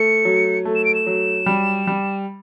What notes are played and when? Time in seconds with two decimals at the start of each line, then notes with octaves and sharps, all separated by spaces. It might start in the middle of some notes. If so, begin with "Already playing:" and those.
Already playing: A3 C#7
0.25 F#3
0.65 A3
0.75 E7
0.85 D7
0.95 E7
1.07 F#3
1.46 G3
1.87 G3